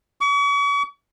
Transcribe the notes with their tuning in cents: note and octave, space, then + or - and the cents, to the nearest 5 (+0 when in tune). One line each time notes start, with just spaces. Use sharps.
C#6 +40